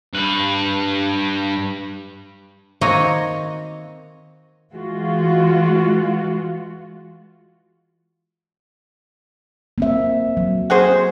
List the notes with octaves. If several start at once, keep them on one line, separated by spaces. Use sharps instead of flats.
G2 B4
D#3 A#3 C4 F#4 C#5 D#5
E3 G#3 F4 F#4
A#3 C4 E5
F#3
F#4 G#4 C5